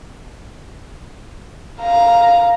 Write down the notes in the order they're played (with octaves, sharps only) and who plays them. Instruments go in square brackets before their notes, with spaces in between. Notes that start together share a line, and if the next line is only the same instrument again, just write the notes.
[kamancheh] F5 A#5